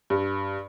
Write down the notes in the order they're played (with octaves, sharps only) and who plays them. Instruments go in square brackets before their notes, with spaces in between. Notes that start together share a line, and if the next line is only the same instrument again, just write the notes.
[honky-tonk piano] G2